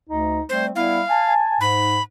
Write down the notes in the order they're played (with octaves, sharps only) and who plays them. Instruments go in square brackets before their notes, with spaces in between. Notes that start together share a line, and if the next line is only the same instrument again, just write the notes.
[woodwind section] D2 D#4
[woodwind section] G3 A3 C4 [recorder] C5
[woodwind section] G3 B3 E4 [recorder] F5
[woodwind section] G#5 A5
[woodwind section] G#2 [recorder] B5